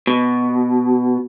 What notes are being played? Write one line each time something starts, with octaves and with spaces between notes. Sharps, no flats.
B2